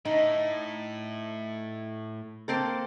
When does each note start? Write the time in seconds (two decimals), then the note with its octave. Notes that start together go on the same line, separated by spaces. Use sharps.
0.05 A2 D#4
2.48 A#3 C4 A4